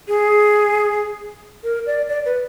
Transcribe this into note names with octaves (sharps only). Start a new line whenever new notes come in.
G#4
A#4
D5
D5
B4